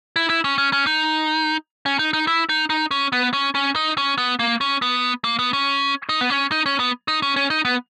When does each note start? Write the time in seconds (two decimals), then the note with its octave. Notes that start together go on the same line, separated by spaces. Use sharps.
0.16 E4
0.30 E4
0.44 C#4
0.58 C#4
0.73 C#4
0.87 D#4
1.86 C#4
1.99 D#4
2.13 D#4
2.27 E4
2.49 D#4
2.70 D#4
2.91 C#4
3.13 B3
3.33 C#4
3.55 C#4
3.76 D#4
3.98 C#4
4.18 B3
4.39 A#3
4.61 C#4
4.82 B3
5.24 A#3
5.39 B3
5.53 C#4
6.09 D#4
6.21 B3
6.30 C#4
6.52 D#4
6.66 C#4
6.80 B3
7.08 D#4
7.22 C#4
7.36 C#4
7.50 D#4
7.65 B3